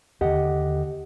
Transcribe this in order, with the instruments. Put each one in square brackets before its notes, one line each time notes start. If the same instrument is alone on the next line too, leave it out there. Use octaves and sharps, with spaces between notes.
[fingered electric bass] D#2 D3 [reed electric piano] G4 D#5 F#5